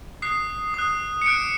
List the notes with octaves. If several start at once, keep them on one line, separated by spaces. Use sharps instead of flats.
D#6 F#6 C7
D#6 F#6
C#7
D6 F#6 D7